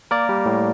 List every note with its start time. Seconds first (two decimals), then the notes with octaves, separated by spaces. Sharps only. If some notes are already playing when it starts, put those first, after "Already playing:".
0.11 A#3 A#4 D5
0.29 G3
0.46 A2